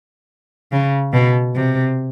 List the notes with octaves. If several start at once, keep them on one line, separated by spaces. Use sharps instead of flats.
C#3
B2
C3